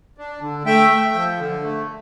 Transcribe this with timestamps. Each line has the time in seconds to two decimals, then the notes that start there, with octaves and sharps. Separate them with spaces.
0.18 D4
0.41 D3
0.65 A3 E5 G5
0.90 A3
1.14 F3
1.39 D3
1.63 A3